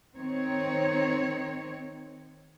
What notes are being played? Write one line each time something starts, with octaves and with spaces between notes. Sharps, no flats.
D#3 C4 D#4 C#5